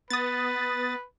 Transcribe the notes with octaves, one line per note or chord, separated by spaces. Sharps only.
B3 B4 D#6 A6